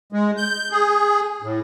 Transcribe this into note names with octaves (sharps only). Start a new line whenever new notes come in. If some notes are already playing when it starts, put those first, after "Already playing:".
G#3
G6
G#4
A2